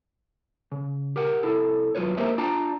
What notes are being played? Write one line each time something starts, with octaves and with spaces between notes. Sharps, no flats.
C#3
G4 A#4 F#5
C2 E4 A4
D#2 F#3 D4 F4 B4 C#5
A#3 G4 A#4 C5 D#5 E5
D4 F4 D5 G5 A5 A#5